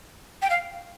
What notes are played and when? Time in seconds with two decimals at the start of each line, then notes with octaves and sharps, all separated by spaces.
0.42 G5
0.50 F5